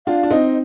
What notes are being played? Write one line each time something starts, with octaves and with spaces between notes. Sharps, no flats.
D4 F4 F5
D4
C4 D#4 D#5